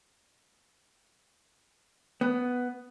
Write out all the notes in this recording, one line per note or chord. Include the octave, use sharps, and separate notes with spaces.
B3